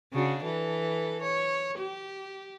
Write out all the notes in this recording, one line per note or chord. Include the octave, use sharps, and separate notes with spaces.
C#3 D4 F#4
E3 A4
C#5
G4